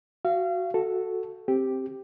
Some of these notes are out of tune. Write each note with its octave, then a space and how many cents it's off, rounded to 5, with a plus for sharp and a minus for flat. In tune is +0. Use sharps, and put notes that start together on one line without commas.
F#4 +0 F5 -30
F#4 +0 A4 +0
C4 +5 G4 +0